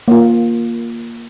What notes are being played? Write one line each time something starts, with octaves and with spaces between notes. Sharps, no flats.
A#3 F4